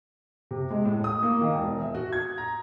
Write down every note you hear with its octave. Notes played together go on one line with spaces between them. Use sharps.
C3
G#3
A2
D#6
A#3
D#3
E1
E5
F#4
G#6
A#5